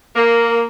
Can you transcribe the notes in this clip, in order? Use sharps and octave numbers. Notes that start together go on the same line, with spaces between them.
A#3